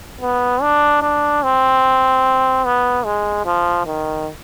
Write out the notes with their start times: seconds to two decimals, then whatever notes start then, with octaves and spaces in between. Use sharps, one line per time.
0.21 B3
0.62 D4
1.02 D4
1.43 C4
2.65 B3
3.05 G#3
3.46 F3
3.86 D#3